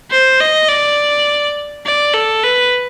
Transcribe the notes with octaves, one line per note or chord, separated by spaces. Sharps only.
C5
D#5
D5
D5
A4
B4